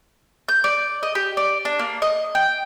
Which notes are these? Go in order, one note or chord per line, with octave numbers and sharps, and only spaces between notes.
G6
D5
D#5
G4
D5
D4
A#3
D#5
G5